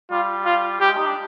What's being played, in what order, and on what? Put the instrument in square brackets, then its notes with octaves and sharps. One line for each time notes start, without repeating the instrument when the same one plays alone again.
[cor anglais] G3 [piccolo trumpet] F4
[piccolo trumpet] F4
[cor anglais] G3 [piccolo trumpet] G4
[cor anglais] G#3
D#4
D4